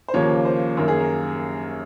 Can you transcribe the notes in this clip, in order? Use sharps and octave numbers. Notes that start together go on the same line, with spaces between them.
C5
D#2 C#3 F3 A#3 C#5
C5
F#2 D#3 A#3 A#4
G#4
A#4